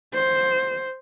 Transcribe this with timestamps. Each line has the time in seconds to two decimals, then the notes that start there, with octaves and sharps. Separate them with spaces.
0.14 C5